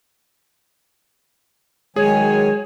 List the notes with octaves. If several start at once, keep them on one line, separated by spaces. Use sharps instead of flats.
D#3 F#3 G#3 G#4 C#5 G#5